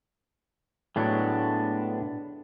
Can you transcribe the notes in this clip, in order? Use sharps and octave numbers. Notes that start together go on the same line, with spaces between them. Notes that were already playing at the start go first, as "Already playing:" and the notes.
A2 F#3 G#3 B3 D4 C#5